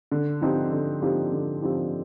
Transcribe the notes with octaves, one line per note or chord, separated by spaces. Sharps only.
D3
F3 C4 D#4 G4
D3
F3 C4 D#4 G4
D3
F3 C4 D#4 G4